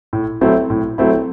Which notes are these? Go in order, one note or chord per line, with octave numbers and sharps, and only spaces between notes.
A2
F#3 A3 C4 E4
A2
F#3 A3 C4 E4